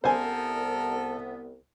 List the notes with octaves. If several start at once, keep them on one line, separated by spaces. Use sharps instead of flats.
C2 B3 A4 A#4 C5 G#5